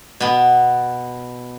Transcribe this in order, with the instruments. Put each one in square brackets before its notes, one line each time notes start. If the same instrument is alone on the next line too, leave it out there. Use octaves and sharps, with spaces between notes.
[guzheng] B2 B3